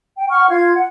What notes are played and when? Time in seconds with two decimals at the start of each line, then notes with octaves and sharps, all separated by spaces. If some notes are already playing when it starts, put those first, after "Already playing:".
0.18 G5
0.30 F#5 C#6 F6
0.50 F4 F5 G#6
0.75 F#5